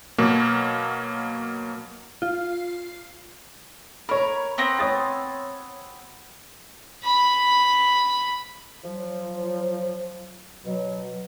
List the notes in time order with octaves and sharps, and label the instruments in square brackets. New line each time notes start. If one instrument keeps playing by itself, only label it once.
[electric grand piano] B2 F#3 A#3
[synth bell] F4
[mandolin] A#4 [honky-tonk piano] C#5 B5
[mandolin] B3 C4 A#5
[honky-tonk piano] C#5 D#6 A6
[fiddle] B5
[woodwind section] F3 F#3
B2 F#3